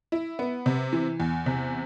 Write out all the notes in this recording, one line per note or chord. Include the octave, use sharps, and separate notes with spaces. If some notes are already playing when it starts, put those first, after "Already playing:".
E4
B3
C3
E3
E2
C3